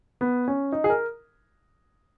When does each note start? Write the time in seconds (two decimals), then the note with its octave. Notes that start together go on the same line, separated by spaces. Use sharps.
0.21 B3
0.48 C#4
0.72 D#4
0.84 G#4
0.90 A#4